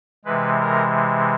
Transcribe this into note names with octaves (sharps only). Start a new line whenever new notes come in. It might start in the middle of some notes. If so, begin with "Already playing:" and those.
C3 E3 G#3 B4
A#4